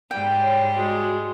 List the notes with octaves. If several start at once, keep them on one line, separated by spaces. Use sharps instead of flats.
G#2 G3 G5
C#5
G#3 F#4